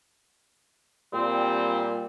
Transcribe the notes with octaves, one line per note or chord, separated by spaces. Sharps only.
A#2 G3 C4